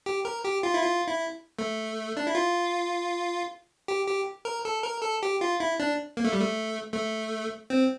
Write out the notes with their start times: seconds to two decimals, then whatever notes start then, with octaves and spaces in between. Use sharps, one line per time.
0.06 G4
0.25 A#4
0.45 G4
0.63 F4
0.74 E4
0.83 F4
1.07 E4
1.59 A3
2.17 D4
2.27 E4
2.35 F4
3.88 G4
4.07 G4
4.45 A#4
4.65 A4
4.84 A#4
5.02 A4
5.23 G4
5.41 F4
5.60 E4
5.80 D4
6.17 A#3
6.24 A3
6.33 G3
6.40 A3
6.94 A3
7.70 C4